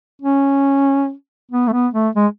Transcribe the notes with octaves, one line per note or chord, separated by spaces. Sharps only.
C#4
B3
A3
B3
A3
G#3